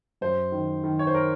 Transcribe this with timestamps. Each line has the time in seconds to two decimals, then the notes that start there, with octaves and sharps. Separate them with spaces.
0.21 F#2 C5
0.52 D#3
0.84 D#3
0.99 C#5
1.07 C5
1.15 A#4